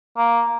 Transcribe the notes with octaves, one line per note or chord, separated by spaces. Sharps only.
A#3